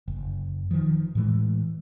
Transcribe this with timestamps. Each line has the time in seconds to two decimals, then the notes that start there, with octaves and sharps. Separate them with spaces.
0.08 F#1
0.71 D#3 F3
1.15 A2 E3 G#3